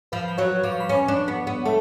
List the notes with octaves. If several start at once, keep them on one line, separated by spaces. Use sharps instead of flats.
F3 B4 B5
B5
F#3 C#5 C#6
F3 D6
C#6
B5
C#4 C#5 C#6
D4
B3
B3
A3 A4 A5